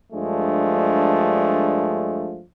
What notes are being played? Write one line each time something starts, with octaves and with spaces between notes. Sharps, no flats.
G2 F3 G#3 A3 D4